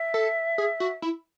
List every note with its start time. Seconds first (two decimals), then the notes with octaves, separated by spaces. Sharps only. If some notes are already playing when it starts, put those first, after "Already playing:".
Already playing: E5
0.14 A4
0.58 G#4
0.80 F#4
1.02 E4